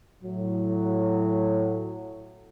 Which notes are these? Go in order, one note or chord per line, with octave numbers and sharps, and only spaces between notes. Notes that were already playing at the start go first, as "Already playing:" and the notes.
A2 F#3